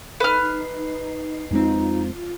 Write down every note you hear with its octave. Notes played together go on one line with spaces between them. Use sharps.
D#4 B4 F6 C7
F2 G#3 C4 D#4 F4